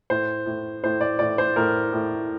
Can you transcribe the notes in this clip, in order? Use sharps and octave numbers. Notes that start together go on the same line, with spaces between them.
A2 C5
A2
A2 C5
D5
A2 D5
C5
A2 A#4
A2